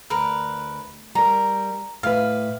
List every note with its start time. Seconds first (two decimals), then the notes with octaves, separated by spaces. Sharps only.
0.10 D2 A#4 B4
1.15 G3 A#4 A#5
2.03 A2 B4 F5